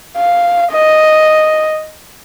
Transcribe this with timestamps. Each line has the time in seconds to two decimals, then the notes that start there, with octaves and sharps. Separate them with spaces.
0.17 F5
0.72 D#5